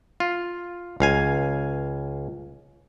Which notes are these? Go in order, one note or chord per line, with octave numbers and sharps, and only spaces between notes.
F4
C#2 F5 G#5